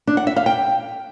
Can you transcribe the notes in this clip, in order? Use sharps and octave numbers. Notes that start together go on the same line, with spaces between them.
D4
F#5
E5
F5
G5